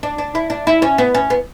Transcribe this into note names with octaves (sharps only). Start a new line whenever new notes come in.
D4
D4
E4
D4
E4
C#4
B3
C#4
B3